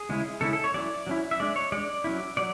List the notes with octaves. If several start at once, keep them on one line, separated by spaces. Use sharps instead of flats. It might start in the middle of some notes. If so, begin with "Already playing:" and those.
Already playing: G#4
C#3 G#3 C#4 E4
C#3 G#3 C#4 E4 A4
A4
C#5
F#3 C#4 E4 D5
F#3 C#4 E4
E5
G#3 D4 D5
C#5
G#3 D5
D4
F#3 C#4 E4
F#3 D5